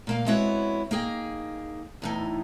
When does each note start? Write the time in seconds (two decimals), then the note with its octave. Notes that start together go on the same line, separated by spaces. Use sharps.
0.07 A#2 A#3 F5
0.26 G#3 B3 C4 E4 F#4 C#5
0.91 A#3 D#4 G#4 G5
2.02 E2 A2 D#4